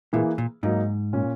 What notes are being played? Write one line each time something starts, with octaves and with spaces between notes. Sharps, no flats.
A#2 E3 A#3 E4 G#4
A#2
G#2 F#3 A#3 D#4
A#2 A#3 C#4